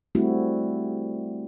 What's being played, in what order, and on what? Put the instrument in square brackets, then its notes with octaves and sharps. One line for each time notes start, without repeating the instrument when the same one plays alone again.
[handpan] G3 A3 C4 E4 F#4